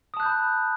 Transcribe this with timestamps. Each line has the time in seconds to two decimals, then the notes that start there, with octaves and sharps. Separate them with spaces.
0.14 D#6
0.17 A5
0.20 F#6
0.23 G6
0.26 B5